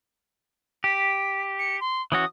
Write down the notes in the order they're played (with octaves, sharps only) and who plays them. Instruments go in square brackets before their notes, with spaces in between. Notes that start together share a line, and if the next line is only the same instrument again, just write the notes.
[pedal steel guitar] G4 [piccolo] B6
[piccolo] C#7
C6
[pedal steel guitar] E3 C#4 F#4 [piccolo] D#6